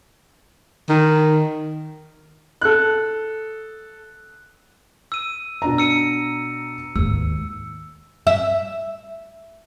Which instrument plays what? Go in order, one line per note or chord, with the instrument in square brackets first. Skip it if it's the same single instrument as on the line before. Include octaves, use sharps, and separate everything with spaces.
[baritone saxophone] D#3
[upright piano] A4 F#6
[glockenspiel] E6 D#7
[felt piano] B2 D4 A#5
[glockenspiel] E6 C#7 D#7
[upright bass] D#2 G#2 [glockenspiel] E6
[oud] E5